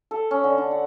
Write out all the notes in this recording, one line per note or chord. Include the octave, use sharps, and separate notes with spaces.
A4
C#4
D3
D4
F#5